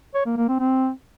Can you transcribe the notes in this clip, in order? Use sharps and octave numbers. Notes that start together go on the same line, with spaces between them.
C#5
A#3
A#3
C4
C4